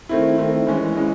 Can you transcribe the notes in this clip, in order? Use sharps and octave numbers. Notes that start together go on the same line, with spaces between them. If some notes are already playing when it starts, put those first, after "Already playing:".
D#3 A3 C4 E4
D#3 A3 C4 E4
E3 G#3 C#4
E3 G#3 C#4